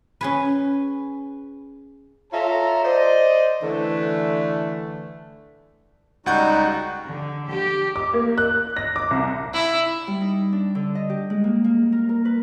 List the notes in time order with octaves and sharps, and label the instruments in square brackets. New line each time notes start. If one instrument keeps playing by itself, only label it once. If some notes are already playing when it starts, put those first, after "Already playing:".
[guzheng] C#4 G#4 B4
[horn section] F4 A4 C#5 E5 A5 A#5
C5 D5 D#5
D3 E3 A3
[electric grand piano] C#2 F#5 G6 [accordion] G3 D#4 F#4
[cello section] D3
G4
[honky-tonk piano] D6
A#3
F#6
A#6
D6
C2
[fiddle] E4
[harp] G3
D#4
D4
D3
D#5
G4
G#3
A#3
A#3
A#4
A#4
B4